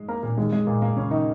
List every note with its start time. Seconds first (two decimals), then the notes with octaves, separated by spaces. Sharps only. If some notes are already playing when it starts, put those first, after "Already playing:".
Already playing: G#2 G#3
0.08 A#3 A#4
0.23 A#2 A#3
0.38 D#2 D#3 G#3
0.53 G#3
0.67 A#2 A#3
0.82 A#2 A#3
0.97 C#3 C#4
1.11 D#3 D#4